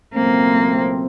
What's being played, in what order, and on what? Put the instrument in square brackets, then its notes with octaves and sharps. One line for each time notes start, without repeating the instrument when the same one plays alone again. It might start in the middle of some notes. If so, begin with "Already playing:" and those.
[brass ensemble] C#2 B2 F#3 A3 C4 [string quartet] A#3